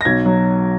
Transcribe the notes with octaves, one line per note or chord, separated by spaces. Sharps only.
A#6
B1 G#6
F#3